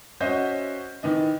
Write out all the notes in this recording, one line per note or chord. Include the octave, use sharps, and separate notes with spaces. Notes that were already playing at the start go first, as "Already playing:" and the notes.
C#4 F#4 C5 D#5 E5 G6
D#3 E3 D#5